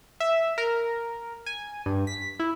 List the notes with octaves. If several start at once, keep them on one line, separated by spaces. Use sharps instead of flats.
E5
A#4
G#5
G2
B6
E4